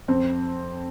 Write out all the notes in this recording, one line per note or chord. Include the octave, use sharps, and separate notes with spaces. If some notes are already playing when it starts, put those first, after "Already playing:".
F2 C4